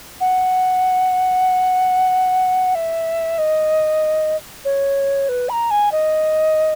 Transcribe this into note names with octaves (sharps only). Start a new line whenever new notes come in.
F#5
E5
D#5
C#5
B4
B5
A#5
G#5
D#5